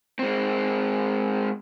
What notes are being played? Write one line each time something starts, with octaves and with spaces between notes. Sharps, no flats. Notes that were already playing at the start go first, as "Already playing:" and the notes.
G#3 C4